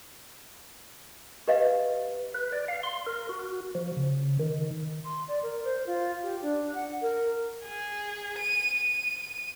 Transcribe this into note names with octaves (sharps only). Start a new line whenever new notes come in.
G4 B4 D#5 F5
B4
D5
F5
C6
A#4
F#4
F3
C#3
D#3
C6
D5
A#4
C5
F4
G4
D4
F#5
A#4
G#4
D#7
D#7